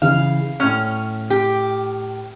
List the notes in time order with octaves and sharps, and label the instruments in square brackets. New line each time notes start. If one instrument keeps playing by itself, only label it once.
[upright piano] C#3 E3 [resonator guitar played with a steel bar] F5
[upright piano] A2 F6 [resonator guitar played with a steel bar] C#4
[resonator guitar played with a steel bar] G4